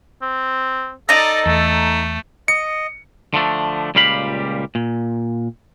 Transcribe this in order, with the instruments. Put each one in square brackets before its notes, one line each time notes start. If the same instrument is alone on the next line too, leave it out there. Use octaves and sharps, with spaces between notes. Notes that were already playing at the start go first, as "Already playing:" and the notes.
[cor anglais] C4
[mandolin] D#4 A#5 [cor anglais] A4 [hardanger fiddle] D5 D#5
[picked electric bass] E2 [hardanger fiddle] A3
[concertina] D#5 [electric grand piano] C#7
[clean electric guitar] D3 F3 A3 D4
C#2 A#2 G3 G4 F5 B5
A#2